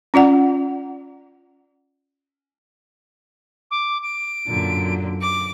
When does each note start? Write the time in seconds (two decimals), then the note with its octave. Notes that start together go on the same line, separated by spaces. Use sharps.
0.14 C#4 F4 D5 F#5
3.71 D6
4.03 D7
4.47 F#2 A#2 D3
5.22 D6